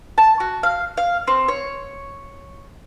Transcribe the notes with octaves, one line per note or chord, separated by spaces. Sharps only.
A5
F#4
F5
F5
C4
C#5